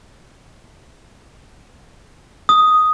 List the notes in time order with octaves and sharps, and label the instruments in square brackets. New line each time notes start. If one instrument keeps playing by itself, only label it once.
[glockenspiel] D#6